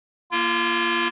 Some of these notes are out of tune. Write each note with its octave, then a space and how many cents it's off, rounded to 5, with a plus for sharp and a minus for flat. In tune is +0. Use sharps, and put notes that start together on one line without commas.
A#3 +15 F4 -30